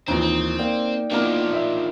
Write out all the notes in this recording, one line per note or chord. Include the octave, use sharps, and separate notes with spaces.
D#2 A#2 E3 C4 D#4
C4
A#3 D5 G5
D#3 F3 A#3 B3 D4 E4 A#4
E5